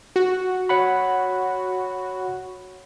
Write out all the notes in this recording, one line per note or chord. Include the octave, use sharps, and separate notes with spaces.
F#4
C#5 F#5 B5